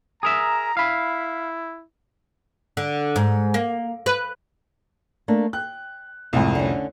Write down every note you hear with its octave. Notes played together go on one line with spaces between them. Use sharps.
G#4 A#4 E5 A#5
E4 F5 B5
D3
G#2
A#3
B4
A3 A#3 D4
G5 F#6
C2 F2 G#2 A3 C4
D3 C#4